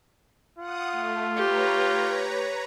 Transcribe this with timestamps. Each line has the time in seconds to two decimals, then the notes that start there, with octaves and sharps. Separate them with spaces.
0.59 F4 F#5 D#6
0.93 A3
1.36 G4 B4 C#5 A#5